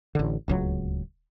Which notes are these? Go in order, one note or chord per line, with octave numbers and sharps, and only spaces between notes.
A1 D3
D1 C#2 F#3